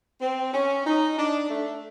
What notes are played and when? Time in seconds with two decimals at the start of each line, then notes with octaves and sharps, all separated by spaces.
0.21 C4
0.53 C#4
0.86 D#4
1.18 D4
1.50 A3